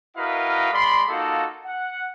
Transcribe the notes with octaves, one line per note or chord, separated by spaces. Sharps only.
E4 F#4 A#4 B4 D#5 F5
G#3 D5 B5 C6
A#3 D#4 F4 F#4 A4
F#5